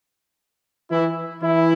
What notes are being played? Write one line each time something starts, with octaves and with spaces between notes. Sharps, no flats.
E3 E4
E3 E4